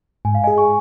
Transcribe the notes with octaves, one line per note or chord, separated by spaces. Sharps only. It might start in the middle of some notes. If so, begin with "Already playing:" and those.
G#2 G#5
F5
G#4 D#5 G#5
G#5 C#6